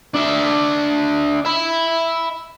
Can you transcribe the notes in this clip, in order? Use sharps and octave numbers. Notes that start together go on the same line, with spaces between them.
D4 E5
E5 B5